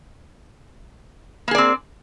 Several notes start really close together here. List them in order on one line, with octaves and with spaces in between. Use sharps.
A#3 G#4 D5 C4